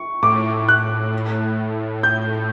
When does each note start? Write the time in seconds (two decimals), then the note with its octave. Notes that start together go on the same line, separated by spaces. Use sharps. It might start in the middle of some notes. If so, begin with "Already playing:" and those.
Already playing: C#6
0.23 A2 D6
0.69 F#6
2.03 G6